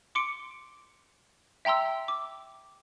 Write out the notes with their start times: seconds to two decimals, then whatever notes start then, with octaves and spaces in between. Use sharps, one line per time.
0.15 C6 D6 C#7 D7
1.65 E5 G5 A#5 C6 E6
2.08 D6